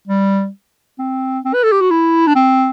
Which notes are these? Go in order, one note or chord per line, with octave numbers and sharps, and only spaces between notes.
G3
C4
C4
B4
A4
G4
F#4
E4
D4
C4